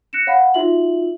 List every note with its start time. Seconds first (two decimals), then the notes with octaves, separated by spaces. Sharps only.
0.13 F#6 A#6 C#7 D7 E7
0.27 C#5 F5 F#5 B5
0.54 D#4 F4 F#4 E5 F#7